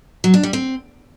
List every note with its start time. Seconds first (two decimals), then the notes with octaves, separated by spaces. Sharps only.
0.24 F#3
0.34 D4
0.43 G3
0.53 C4